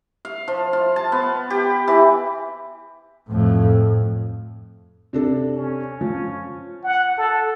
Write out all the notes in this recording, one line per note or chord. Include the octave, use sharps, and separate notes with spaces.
F5
F3
F4
A5
B3
G4
E3
F2 A2
C3 D4 A4
C#4
F3
F#5
A4